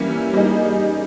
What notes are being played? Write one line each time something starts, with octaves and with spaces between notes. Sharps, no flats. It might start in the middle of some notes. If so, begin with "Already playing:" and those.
Already playing: E3 G3 A#3 C#4 E4
G3 A#3 D#4 G#4